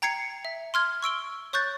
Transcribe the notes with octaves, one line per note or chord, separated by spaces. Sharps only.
G5 A#5 G#6 C7 C#7
E5
C6 F6 G#6
C#6 E6 D7 G7
C#5 C#6 F#6 G6 A6